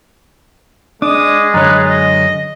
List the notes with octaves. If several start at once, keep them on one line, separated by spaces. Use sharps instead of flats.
G#3 D4 D6 D#6
F#2 D3 B4 C#5 A#5 A6
D#5 A#6